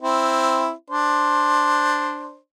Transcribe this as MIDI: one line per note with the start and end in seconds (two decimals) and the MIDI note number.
0.02 0.72 60
0.02 0.72 64
0.90 2.37 62
0.90 2.37 72